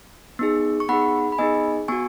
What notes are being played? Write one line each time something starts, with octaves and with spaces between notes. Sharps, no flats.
B3 D#4 G#4
C#6
B3 D#4 G#4 F#5 B5
B5
B3 D#4 G#4 D#5 G#5
B3 F#4 G#5 C#6